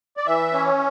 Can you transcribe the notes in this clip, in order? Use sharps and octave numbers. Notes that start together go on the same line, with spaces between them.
D5
E3 E5
C#4